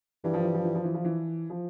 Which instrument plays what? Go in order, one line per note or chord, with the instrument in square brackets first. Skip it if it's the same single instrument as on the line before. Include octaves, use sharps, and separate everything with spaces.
[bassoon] G2 [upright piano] E3
[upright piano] F3
E3
F3
E3
F3
E3
F3
E3
F3